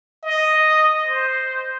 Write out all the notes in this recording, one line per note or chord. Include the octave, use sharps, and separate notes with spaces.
D#5
C5